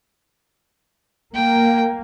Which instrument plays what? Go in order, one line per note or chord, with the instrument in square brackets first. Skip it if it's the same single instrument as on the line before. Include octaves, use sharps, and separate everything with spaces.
[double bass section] A#3 [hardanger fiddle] G5